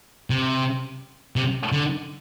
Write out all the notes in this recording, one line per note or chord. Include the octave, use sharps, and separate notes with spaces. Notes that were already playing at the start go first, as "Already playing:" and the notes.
C3
C3
D3